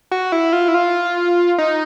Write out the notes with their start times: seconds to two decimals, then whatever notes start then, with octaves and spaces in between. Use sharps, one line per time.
0.12 F#4
0.32 E4
0.53 F4
0.68 E4
0.75 F4
1.58 D#4